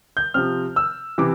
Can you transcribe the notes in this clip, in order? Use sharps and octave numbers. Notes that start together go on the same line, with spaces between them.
G6
C3 F3 C4 F6
E6
C3 E3 D6